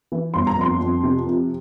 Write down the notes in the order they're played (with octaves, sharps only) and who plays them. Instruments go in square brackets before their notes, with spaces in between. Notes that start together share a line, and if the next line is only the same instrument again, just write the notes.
[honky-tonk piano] E3
G1 C6
A#5
F2 C6
F2
C3
F3